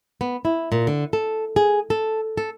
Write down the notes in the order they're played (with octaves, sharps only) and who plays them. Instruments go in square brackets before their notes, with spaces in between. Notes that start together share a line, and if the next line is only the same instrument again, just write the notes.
[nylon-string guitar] B3
E4
A#2
D3
A4
G#4
A4
A4